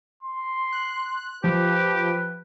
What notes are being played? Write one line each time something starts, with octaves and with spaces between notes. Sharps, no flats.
C6
F#6
F3 G4 B4